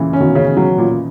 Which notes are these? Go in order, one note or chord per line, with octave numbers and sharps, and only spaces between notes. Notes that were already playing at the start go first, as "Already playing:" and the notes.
Already playing: A#2 C#3 E3
C#4
B2 D#3
C#3
F#3
A#2